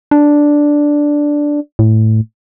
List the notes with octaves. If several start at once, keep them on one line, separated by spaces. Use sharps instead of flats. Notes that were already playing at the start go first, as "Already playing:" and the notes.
D4
A2